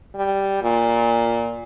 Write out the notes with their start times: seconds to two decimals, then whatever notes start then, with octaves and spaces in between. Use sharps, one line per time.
0.15 G3
0.63 A#2